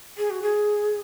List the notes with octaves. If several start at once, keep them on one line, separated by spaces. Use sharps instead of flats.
G#4
F#4
G#4